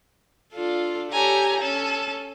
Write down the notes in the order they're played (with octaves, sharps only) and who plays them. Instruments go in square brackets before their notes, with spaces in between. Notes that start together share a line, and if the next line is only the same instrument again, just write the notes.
[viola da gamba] D4 F4 A4
[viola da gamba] G4 A4 C#5 [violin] G#5 A#5
[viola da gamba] C#4 [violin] A4